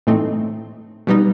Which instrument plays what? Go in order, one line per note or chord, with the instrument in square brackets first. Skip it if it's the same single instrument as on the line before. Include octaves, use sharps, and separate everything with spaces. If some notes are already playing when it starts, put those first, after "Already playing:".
[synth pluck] A2 E3 A3 C4 D#4
B2 G3 B3 D#4